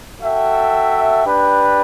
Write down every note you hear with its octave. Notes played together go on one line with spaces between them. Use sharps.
F#4 A4 E5 G5
D4 G4 B4